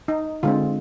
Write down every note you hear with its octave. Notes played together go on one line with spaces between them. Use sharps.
D#4
D3 G#3 C4 F4